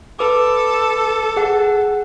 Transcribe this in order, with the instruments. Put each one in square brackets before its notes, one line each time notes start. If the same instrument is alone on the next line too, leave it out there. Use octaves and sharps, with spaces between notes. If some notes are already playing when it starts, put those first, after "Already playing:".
[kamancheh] A4 [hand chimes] B4 D6
[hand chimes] G#4 F#5